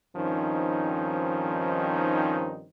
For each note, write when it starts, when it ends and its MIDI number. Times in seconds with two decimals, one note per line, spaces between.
0.16 2.66 43
0.16 2.66 51
0.16 2.66 53
0.16 2.66 60
0.16 2.66 61
0.16 2.66 63